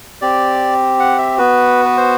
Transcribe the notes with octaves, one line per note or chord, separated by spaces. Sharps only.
C4 G4 D5
F#5
E5
B3 F#4 B4
B4
C5